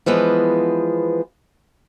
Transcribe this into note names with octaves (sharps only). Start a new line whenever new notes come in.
E3 F3 G#3 B3